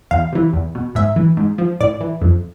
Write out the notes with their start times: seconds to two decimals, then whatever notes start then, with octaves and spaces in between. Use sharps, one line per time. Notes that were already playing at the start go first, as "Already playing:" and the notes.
0.11 E2 F5
0.32 C3 E3
0.53 E2
0.75 B2
0.95 G#2 E5
1.16 E3
1.37 G#2
1.58 F3
1.81 A2 D5
2.01 E3
2.22 F2